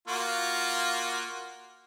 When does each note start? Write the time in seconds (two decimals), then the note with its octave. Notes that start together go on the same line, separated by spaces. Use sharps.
0.08 A#3 F4 F#4